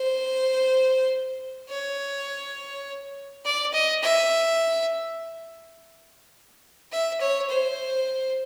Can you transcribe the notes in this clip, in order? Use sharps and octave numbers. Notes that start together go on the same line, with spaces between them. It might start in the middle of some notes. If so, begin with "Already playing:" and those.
Already playing: C5
C#5
D5
D#5
E5
E5
C#5
C5